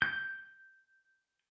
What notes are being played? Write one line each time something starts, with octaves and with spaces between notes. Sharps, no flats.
G6